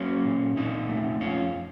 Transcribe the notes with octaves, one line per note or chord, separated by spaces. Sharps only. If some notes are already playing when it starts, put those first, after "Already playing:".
Already playing: F#3 A#3 C#4
A#2
A#2 C4 D#4
A3
F2 C#4 F4